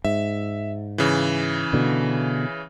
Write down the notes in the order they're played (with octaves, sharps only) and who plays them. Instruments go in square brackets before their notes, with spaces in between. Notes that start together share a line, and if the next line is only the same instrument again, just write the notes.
[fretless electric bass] G#2 [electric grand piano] E5
[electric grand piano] C#3 E3
[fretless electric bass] B2 D3